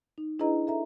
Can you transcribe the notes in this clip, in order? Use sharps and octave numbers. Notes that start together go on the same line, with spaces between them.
D#4
D4 E4 G#4 B4 D#5 A#5
A4 E5 A#5